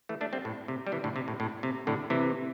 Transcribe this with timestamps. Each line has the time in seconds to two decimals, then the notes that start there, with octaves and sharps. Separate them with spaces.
0.09 E3 A3
0.21 A3 D4
0.33 G3 C4
0.45 A2
0.68 C3
0.87 G3
0.92 C3 E3
1.04 A2 D3
1.16 C3
1.28 A2
1.40 A2
1.63 C3
1.87 A2 D3
2.10 C3 E3